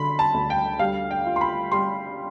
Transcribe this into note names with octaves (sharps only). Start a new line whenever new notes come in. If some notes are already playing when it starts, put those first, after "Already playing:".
Already playing: D3 B5 C6
A5
D2
G5
G3 F5
G5
F4
C6
B5
G3 C6